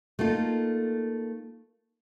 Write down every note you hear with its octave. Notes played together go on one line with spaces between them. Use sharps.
A3 A#3 D#4 F4